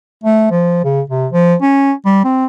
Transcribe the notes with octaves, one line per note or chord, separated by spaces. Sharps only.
A3
F3
C#3
C3
F3
C#4
G3
C4